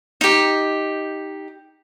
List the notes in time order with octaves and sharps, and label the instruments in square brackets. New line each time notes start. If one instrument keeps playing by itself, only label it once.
[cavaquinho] D#4 G4